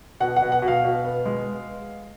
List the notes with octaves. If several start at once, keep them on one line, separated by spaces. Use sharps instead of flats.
B2 F#5
F#5
B2
F#5
B2
F5
B2
B3
G#3